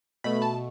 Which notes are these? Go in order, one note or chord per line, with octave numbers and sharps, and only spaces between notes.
B2 A3 B5
A5